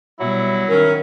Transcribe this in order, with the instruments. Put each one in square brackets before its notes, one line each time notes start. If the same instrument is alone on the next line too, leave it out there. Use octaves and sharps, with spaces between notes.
[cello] B2 G3 [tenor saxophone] F#3 [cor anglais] E4
[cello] D#3 C#4 [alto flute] A#4